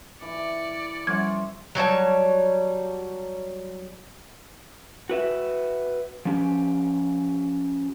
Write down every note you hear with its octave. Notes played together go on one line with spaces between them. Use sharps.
E3 D5 C#7
F3 G3 C#4 C5 E5 F#5 G#6
F#3 G3 C#5 A5
F#4 B4 E5
F3 C#4 G4